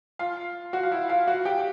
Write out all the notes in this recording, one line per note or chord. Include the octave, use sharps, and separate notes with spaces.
F4 F5
F#4 F#5
F5
E4 E5
F4 F5
F#4 F#5
G4 G5